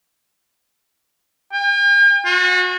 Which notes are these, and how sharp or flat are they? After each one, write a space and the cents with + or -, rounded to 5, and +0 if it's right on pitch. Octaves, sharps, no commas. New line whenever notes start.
G5 +45
F#4 -35